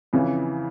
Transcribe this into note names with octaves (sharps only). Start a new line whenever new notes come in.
F2 C#3 E3